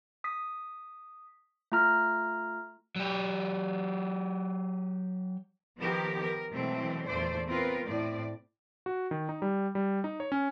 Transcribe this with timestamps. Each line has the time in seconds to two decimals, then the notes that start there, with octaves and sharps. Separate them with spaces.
0.24 D#6 B6
1.72 A3 F4 A#5 F6
2.96 F#3 G4
5.78 D#3 F3 B3 G4 A#4
6.22 A#4
6.53 B2 E3 F#3 G#3 A3 C4
7.06 E2 A#2 D3 A3 C5 D5
7.48 B3 C4 F4 A#4 B4
7.85 A2 C4 D5
8.86 F#4
9.11 D#3
9.29 D#4
9.42 G3
9.75 G3
10.04 D#4
10.20 C#5
10.32 C#4